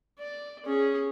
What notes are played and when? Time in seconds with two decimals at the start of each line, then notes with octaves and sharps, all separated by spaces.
0.18 D5
0.65 C#4 G#4